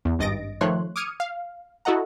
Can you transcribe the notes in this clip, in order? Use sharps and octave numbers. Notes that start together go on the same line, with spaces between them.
E2
G#1 G2 D#5 A6 A#6 D7
D#3 F3 A3 C#5 C6 F#6
D6 D#6 F6 G#6 C#7 D#7
F5
E4 F#4 A4 D#5 F#5 A#5